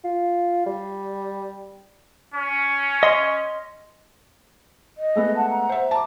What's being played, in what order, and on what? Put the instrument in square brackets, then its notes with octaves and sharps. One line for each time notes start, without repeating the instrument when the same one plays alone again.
[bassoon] F4
G3
[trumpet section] C#4
[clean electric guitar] D#5 C6
[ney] D#5
[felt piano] G#3 A3 B3
[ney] F#5 [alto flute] A5
[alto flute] A#5
[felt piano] C5 E5
A5 D6